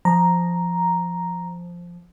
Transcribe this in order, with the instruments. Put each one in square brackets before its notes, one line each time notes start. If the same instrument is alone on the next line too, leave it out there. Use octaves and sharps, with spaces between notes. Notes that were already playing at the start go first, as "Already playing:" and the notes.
[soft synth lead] F3 [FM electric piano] A#5